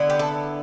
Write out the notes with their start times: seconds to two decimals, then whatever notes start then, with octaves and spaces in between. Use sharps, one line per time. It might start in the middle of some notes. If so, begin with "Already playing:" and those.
Already playing: D3 B3 E4
0.10 G4
0.19 A4